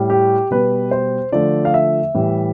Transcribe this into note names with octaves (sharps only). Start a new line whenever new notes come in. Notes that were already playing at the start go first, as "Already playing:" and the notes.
Already playing: A2 G3
G4
B2 G3 B4
C5
D3 F3 A3 D5
F5
E5
A2 E3 G3